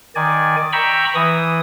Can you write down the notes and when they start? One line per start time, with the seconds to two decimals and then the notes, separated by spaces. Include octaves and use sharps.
0.15 D#3 D5 G#5
0.73 G5 A#5 B5 C#6 E6
1.15 E3 D#6